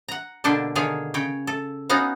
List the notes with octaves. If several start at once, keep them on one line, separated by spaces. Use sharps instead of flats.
F#5 A#5
B2 D3 A#3 D4 G4 A4
D3 D#3 G#4 C#5 F5
C#3 C#5 G5
A4
B3 C#4 D#4 F#4 F5 A#5